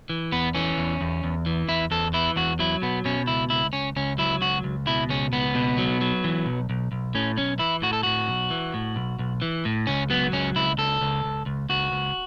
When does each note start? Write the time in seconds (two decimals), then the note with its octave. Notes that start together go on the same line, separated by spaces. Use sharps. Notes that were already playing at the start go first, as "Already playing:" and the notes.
0.10 E3
0.32 E2 B3
0.55 E3 C#4
0.78 E2
1.01 E2
1.24 E2
1.46 E3
1.69 E2 E4
1.91 E2 A4
2.14 E3 E4
2.36 E2 F#4
2.59 F#3 E4
2.82 B2 B3
3.05 B2 C#4
3.27 C#2 E4
3.50 C#2 E4
3.73 C#2 C#4
3.96 C#2 C#4
4.18 F#3 E4
4.41 C#2 F#4
4.64 C#2
4.87 B2 E4
5.09 C#2 C#4
5.32 C#2 B3
5.55 B2
5.78 F#3
6.01 F#3
6.24 E3
6.46 B1
6.70 B1
6.92 B1
7.15 A2 C#4
7.37 B1 C#4
7.59 E3 E4
7.82 A2 F#4
7.93 A4
8.03 A2 F#4
8.28 B1
8.51 E3
8.74 A2
8.96 B1
9.19 B1
9.42 E3
9.65 A2
9.87 C#2 C#4
10.10 F#3 B3
10.32 C#2 C#4
10.56 C#2 E4
10.78 C#2 A4
11.01 C#2
11.24 C#2
11.46 C#2
11.69 C#2 F#4
11.92 C#2